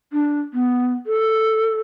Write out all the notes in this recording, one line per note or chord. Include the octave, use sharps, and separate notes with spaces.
D4
B3
A4